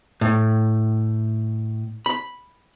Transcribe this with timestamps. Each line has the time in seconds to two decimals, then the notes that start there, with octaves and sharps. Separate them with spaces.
0.21 A2
2.06 B5